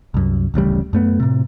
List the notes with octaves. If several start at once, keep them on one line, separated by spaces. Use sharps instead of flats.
C2 F#2
D1 A1 C#3 G3
F#2 A3 B3
A2 C3